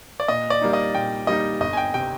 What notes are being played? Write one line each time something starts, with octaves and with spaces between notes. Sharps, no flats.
D5
A#2 D#5
D5
G3 A#3 D#4
D#5
A#2 G5
G3 A#3 D#4 D#5
G1 D#5
G#5
G5
C3 G5